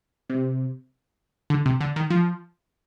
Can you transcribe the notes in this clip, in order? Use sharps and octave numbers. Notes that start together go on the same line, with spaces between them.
C3
D3
C3
D3
D#3
F3